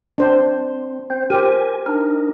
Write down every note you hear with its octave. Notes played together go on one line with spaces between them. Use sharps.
C4 D4 C5
C4 C5
G4 A#4 C5 G#5
D4 D#4 A#4